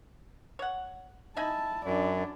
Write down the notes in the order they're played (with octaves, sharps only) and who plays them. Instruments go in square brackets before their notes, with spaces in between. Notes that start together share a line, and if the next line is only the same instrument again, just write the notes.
[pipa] C#5 F#5
[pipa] D#4 E4 G#5 [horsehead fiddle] A5
[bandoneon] F#2 [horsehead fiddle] D4 D5